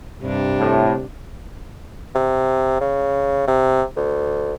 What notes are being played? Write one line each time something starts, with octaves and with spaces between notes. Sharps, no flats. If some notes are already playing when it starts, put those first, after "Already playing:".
G2 C3 D4
A2
C3
C#3
C3
D2